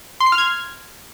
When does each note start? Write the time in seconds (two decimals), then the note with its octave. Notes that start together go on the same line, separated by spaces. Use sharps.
0.20 C6
0.26 C7
0.32 F6
0.38 G#6